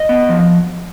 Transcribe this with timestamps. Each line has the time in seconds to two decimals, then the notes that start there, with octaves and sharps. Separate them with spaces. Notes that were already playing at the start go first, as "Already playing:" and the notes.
Already playing: D#5
0.09 B3
0.29 F3